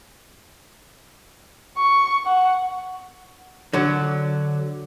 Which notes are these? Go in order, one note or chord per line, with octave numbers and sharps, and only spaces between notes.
C#6
F#5
D3 F#3